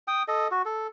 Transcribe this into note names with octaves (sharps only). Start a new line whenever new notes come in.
G5 D#6
A4 D#5
F#4
A4